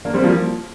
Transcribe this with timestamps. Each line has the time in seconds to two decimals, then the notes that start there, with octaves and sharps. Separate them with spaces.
0.05 A#3 D4
0.14 G3 C4
0.23 F3 A#3